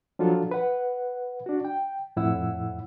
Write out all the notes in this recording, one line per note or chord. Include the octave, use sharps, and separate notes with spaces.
F3 F#3 D4 F4 F#4 A4
B4 F#5
D4 F#4
G5
F2 A2 E4 F#5 E6